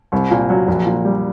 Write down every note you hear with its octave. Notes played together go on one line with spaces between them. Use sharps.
C2
A#2
F#3
A#1
A#2
G3